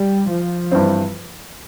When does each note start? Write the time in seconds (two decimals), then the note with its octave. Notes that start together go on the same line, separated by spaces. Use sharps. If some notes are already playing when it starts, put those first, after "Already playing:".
Already playing: G3
0.30 F3
0.71 G2 E3 G3 C4